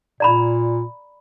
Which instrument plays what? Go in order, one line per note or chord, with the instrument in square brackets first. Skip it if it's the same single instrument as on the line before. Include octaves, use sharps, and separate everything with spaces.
[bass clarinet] A#2 [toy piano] D5 A#5 B5